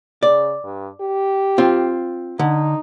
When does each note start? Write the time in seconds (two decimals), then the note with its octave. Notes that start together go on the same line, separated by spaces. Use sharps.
0.23 C#3 D5
0.64 G2
1.01 G4
1.58 C4 F4
2.39 D3 D#4